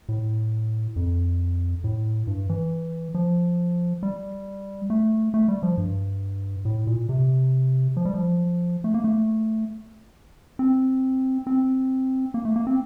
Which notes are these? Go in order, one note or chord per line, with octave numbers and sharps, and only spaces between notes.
A2
F2
A2
G2
E3
F3
G3
A3
A3
G3
F3
G2
A2
A#2
C3
F3
G3
F3
A3
A#3
A3
C4
C4
A#3
A3
A#3
C4